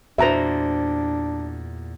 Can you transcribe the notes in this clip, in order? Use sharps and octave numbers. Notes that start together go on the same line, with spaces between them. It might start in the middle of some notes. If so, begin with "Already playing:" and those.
E2 A#2 D4 F#4 C5 E5 A#5